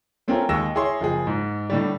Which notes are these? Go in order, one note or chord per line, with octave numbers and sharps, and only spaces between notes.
A3 C4 C#4 F4 G4 A#4
D#2 G#3 C#6 E6 A#6 E7
E4 G#4 C#5 C6
F#1 F3 G#4
G#2
A2 D3 G3